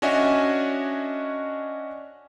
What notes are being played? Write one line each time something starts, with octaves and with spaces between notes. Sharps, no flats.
C#4 D4 F#4 D#5 E5 G#5